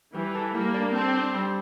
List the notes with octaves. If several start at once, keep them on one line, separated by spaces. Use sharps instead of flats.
E3 G3
A4
G3 A#3
D4
C4 A4
D4
G3